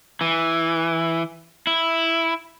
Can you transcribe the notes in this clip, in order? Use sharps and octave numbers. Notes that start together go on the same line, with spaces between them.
E3
E4